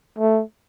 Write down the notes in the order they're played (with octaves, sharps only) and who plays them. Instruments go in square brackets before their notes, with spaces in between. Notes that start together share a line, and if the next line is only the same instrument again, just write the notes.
[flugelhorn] A3